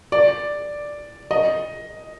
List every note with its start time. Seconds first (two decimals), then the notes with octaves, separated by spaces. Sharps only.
0.12 D5
1.31 D#5